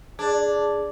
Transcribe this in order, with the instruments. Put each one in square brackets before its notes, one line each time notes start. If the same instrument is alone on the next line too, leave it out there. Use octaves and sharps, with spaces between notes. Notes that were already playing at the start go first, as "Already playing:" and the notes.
[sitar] D4 [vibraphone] G#4